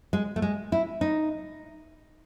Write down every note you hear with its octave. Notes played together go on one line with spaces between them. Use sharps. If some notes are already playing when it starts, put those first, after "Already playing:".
G#3
A3
G#3
E4
D#4